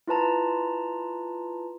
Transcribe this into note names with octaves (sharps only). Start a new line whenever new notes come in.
E4 F4 B4 A5 A#5